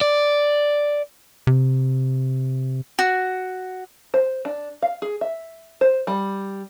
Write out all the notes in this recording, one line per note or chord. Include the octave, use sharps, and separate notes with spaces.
D5
C3
F#4
C5
D4
F5
G#4
E5
C5
G3